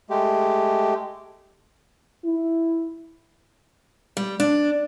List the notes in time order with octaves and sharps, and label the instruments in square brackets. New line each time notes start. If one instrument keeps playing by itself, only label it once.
[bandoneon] G#3 A3 G4
[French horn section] E4
[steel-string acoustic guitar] G3
D4